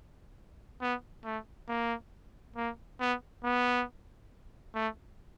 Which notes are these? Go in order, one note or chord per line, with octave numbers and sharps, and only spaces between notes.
B3
A3
A#3
A#3
B3
B3
A3